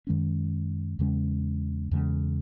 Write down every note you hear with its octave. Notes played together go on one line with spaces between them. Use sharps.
F#2 D#3 G#3 C#4
E2 C#3 G#3 C#4
E2 C#3 G#3